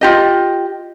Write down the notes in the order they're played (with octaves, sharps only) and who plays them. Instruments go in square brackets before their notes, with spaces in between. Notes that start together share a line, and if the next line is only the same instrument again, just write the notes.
[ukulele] F4 G4 D#5